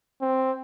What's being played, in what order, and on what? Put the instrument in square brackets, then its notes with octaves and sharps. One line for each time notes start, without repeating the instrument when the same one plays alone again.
[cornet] C4